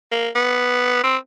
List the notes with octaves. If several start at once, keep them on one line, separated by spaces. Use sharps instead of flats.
A#3
B3
C4